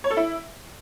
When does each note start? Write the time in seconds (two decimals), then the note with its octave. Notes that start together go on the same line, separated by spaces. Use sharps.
0.04 C#5
0.10 A4
0.17 E4